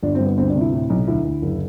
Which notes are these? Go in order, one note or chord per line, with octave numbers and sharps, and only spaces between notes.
G1 D4
C4
G2
B3
D2 C4
D4
C3
E4
A2
B1
D2 E4
D2
F#1